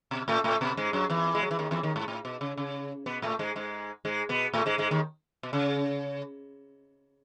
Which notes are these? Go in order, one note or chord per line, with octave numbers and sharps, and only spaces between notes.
B2
A2 A3
A2 A3
B2 B3
G#2 G#3
F#2 F#3
E2 E3
G#3
F#3
E3
D#2 D#3
E2 E3
D#2 D#3
G#2
A2
B2
C#3
C#3
B2 B3
A2 A3
G#2 G#3
G#2 G#3
G#2 G#3
B2 B3
A2 A3
G#2 G#3
G#2 G#3
D#2 D#3
B2
C#3